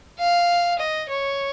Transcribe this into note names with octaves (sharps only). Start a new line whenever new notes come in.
F5
D#5
C#5